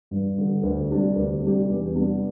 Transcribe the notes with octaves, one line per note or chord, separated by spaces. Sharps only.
G2
D3 G3
D2
C3 G3 D4 G4
D2
C3 G3 D4 G4
E2
C3 G3 B3 D4